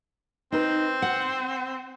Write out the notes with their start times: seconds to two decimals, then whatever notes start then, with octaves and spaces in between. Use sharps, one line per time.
0.52 C4 D#4 B4
1.02 F#5